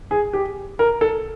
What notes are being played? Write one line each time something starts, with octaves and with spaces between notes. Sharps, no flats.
G#4
G4
A#4
A4